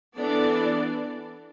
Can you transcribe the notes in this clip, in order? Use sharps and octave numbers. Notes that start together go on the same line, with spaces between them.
E3 B3 D4 A4 D5